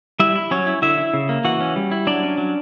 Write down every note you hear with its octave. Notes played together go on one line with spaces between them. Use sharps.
G3 E4 E5
E4
F#3 C#4 C#5
E4
D3 E4 E5
E4
C#3
A#3
E3 F#4 F#5
C#4
G3
E4
F#3 D4 D5
C#4
F#3